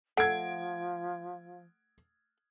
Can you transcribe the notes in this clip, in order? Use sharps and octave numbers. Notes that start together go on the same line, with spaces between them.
F3 A3 F#5 G#6 D7